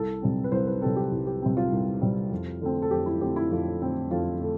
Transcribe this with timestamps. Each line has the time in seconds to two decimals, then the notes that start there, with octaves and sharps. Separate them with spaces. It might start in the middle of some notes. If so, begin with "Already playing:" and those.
Already playing: C2 A4
0.22 C3 G3 C4
0.44 B4
0.52 C2 C5
0.67 B4
0.82 C3 G3 C4 A4
0.96 G4
1.11 C2
1.27 G4
1.42 C3 G3 C4
1.57 F4
1.72 C2
2.01 C3 G3 C4
2.31 F2
2.61 D3 A3 C4
2.82 A4
2.91 F2 G4
3.06 E4
3.21 D3 A3 C4 G4
3.36 E4
3.51 F2 F4
3.81 D3 A3 C4
4.11 F2 F4
4.41 D3 A3